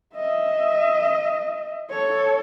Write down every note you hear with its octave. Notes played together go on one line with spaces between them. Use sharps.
D#5 E5
A4 C#5